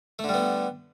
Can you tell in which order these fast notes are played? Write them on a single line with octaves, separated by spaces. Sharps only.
A3 D3 G3 B3